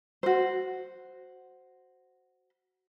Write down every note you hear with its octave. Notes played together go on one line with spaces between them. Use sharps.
F#4 C5